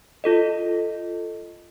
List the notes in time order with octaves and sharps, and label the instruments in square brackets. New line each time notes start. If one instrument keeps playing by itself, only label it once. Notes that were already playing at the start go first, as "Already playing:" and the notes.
[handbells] F4 A4 D#5